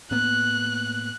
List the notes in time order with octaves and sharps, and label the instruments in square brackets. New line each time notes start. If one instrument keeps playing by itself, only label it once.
[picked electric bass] A2 A#3 B3 [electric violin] F#6